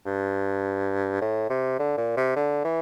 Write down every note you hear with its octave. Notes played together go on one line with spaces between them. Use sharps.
G2
A2
C3
D3
A#2
C3
D3
E3